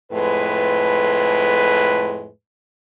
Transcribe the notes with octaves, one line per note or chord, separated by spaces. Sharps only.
F2 A2 G#3 B4